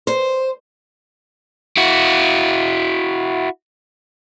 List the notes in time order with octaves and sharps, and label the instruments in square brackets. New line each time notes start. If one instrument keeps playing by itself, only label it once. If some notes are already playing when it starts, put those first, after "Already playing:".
[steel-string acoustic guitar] C5
[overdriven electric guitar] E4 F#4